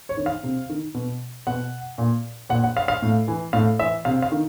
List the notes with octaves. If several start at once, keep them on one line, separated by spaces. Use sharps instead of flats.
C#5
D#3
F5
C3
D#3
B2
B2 F#5
A#2
A#2 F#5
F#5
F5
F5
A2
E3
A2 F5
E3 E5
C3 F5
F5
D#3